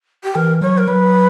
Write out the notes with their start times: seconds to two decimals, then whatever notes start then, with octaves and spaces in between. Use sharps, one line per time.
0.24 G4
0.35 E3 A#4
0.61 F#3 C#5
0.78 A#4
0.87 F#3 B4